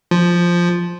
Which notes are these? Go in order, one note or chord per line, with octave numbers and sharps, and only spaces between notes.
F3